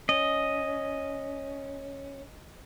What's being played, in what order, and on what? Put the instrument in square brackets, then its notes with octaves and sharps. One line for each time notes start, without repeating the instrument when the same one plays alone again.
[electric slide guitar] C#4 [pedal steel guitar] D#5